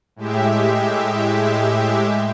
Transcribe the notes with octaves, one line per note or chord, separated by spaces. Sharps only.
A2 G#3 G4 E5